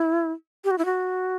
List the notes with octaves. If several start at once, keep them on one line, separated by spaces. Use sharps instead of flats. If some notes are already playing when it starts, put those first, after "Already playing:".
Already playing: E4
G4
F#4
E4
F#4